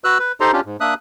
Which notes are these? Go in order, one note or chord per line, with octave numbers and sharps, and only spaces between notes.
F#4 B4 E6 F#6
B4
D#4 G4 A4 C5 A#5 C6
C#4 D4 F4 G4
G#2
A#3 D4 E5 D#6 F#6